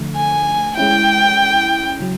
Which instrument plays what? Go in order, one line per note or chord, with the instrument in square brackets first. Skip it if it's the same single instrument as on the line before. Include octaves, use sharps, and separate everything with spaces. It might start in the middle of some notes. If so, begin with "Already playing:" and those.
Already playing: [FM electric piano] D3 F3 A3
[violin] G#5
[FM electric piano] G#3 C#4 E4 [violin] G5
[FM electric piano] C#3 F#3